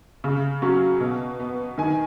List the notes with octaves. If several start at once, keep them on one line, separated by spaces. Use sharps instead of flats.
C#3
F#3 C#4
B2
B3
D#3 G#5